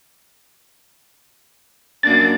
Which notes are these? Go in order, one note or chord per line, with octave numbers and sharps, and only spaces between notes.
F#2 A#3 D4 A6